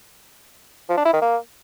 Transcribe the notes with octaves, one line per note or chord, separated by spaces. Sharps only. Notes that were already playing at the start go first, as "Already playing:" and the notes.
F3
D4
E4
D#3
A#3